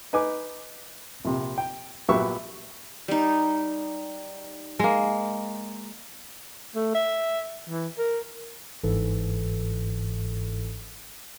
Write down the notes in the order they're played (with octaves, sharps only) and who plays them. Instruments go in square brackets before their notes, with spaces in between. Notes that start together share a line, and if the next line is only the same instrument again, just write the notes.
[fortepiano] D#4 B4 G#5 D6
A#1 C3
G5
A#1 F#3 B3 G4 E5 C#6
[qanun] G3 D#4
[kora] G#3 A#3
[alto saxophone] A3
E5
E3
A#4
[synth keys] G1 G#2 E3 A4